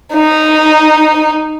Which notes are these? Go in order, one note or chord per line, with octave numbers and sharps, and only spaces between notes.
D#4